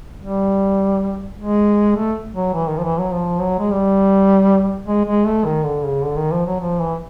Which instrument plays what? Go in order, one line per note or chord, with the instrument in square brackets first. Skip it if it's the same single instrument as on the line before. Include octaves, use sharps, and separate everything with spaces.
[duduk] G3
G#3
A3
F#3
E3
D#3
F3
E3
F#3
F3
F#3
G#3
G3
G#3
G#3
A3
D#3
D3
C#3
D3
D#3
F3
F#3
F3
E3